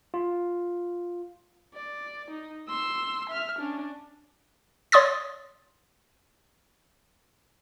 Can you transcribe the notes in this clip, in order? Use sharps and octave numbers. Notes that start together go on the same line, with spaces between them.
F4
D5
D#4
C6 E6
E5 F6
C#4 D4
C#5 C6 D#6 A6